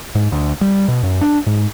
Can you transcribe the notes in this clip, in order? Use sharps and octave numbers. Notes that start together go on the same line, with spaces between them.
G#2
D2
G3
B2
F#2
D4
G#2